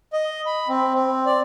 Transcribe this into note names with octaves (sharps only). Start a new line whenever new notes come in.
D#5
B5
C4
C4
D5